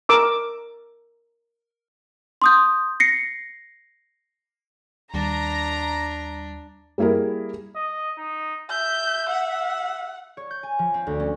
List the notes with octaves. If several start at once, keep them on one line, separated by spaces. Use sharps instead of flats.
A#4 D6 E6
C6 D#6 G6
A#6 C7 C#7
D#2 G3 D4 A#5
G3 A#3 E4 G#4 A#4
D#5
D#4
E5 G6
F#5
C#5
G6
G#5
F3
C4
D2
C#4